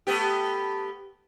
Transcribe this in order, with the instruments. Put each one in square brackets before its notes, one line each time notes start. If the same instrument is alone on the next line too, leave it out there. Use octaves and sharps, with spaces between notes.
[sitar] A3 B3 G4